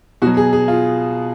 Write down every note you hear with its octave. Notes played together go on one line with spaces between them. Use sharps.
B2 F#3 F#4
G#4
G#4
F4